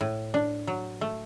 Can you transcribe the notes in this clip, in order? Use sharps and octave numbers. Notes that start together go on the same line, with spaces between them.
A2
D4
F#3
A3